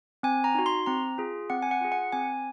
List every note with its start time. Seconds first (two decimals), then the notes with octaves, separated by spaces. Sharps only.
0.23 C4 G#5
0.44 A#5
0.55 D#4 F#4
0.66 C6
0.86 C4 A#5
1.18 F4 G#4
1.50 C4 F#5
1.62 G#5
1.71 F#5
1.81 F4 G#4
1.92 F#5
2.12 C4 G#5